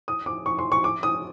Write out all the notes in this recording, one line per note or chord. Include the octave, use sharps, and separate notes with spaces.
D#6
D6
C#6
C6
C#6
D6
D#6